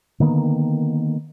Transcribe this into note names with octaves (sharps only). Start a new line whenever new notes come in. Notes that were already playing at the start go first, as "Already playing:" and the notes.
D3 D#3 A#3 B3